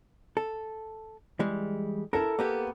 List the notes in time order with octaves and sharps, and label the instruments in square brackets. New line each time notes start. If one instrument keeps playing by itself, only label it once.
[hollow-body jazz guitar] A4
E3 G3 G#3
[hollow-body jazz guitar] E4 A#4 [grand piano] A4
[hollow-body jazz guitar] A#3 B3 G4